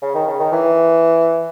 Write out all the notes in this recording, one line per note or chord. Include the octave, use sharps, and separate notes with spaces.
C#3
D#3
C#3
D#3
E3